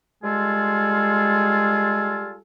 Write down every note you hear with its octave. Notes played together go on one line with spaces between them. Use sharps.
G3 G#3 F4 G#4 A4